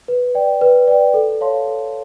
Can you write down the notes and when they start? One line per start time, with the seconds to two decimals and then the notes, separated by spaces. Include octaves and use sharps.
0.08 B4
0.35 D5 G5
0.61 B4
0.88 D5 G5
1.14 A4
1.41 C#5 F5 A5 C6
1.67 A4